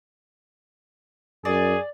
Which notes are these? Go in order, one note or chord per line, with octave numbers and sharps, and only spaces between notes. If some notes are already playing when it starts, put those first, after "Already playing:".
F#2 G#4 D5